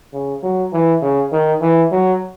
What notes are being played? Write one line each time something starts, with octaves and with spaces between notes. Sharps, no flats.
C#3
F#3
E3
C#3
D#3
E3
F#3